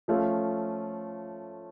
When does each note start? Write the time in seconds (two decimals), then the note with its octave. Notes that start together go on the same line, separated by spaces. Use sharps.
0.08 F3 A3 C#4 F4